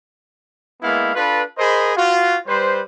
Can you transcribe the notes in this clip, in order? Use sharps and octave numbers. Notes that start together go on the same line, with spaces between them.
G#3 A#3 B3 E4 F5
D4 F4 A4 B4
G#4 A#4 C5 D#5 B5
F4 F#4
G3 B4 C5